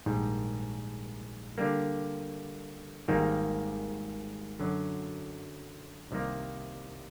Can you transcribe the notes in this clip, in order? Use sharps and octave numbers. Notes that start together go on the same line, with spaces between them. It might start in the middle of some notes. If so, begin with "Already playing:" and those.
A#1 G#2 D#3 G3
D3 G3 A#3
G#1 G#2 D#3 G3 A#3
F#2 D3 F#3
C2 C3 D#3 G3 A#3